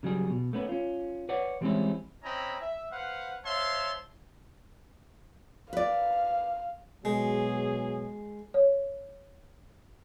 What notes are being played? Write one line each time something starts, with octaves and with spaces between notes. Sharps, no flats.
C#3 F#3 G3 G#4
B2
A3 B3 C#4 B4
C#4 F4
B4 C#5 D5 F#5
E3 G3 G#3 C4 C#4 E4
C4 C#4 E4 D#5 A#5 B5
E5
B4 C5 F5 F#5
C5 C#5 E5 F5 A5 C6
B4 D5 F5
B2 F#3 G#3 G#4
C#5